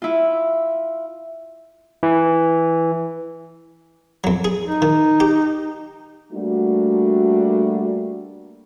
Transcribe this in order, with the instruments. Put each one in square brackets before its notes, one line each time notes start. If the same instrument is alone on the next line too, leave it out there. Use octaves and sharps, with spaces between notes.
[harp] E4 F4
[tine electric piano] E3
[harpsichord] F2 F#3
G#4
[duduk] D#4
[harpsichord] D#3
G4
[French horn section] G3 A3 A#3 D4 F#4